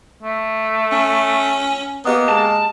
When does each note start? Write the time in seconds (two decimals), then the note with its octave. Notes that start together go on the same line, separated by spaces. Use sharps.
0.22 A3
0.92 C#4
2.05 A#3 B3 G4 D#5 D#6
2.29 G#3 A5